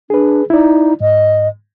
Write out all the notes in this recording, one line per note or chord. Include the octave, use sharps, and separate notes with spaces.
D4 G#4 B4
D#4 E4 D5
G#2 D#5